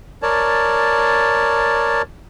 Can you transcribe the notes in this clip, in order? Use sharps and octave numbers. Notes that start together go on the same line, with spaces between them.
A#4 C#5 D5 A5